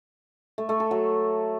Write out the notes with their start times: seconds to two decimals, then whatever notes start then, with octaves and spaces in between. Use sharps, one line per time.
0.58 A3
0.69 A3
0.80 A4
0.91 F#3